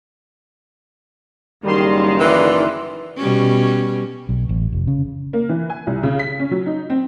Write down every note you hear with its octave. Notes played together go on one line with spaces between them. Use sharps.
F#1 D#3 G3 C6
E3 D5 C6 F#6
B2 G3 C#4
B1
A1
F1
C#3
A#3
E3
G#5
C2
C#3
B6
C#4
F#3
D#4
C4